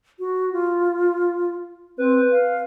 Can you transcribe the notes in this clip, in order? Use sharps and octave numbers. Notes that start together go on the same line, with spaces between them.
F#4
F4
C4 B4
F5